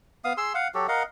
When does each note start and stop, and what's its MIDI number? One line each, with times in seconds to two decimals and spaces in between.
0.24 0.33 59
0.24 0.33 77
0.24 0.33 87
0.37 0.53 68
0.37 0.53 84
0.37 0.53 88
0.54 0.68 77
0.54 0.68 78
0.75 0.87 54
0.75 0.87 66
0.75 0.87 67
0.75 0.87 69
0.88 1.03 70
0.88 1.03 75
0.88 1.03 77
0.88 1.03 78